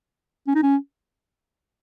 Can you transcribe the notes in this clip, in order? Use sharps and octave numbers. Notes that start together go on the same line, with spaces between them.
C#4
D#4
C#4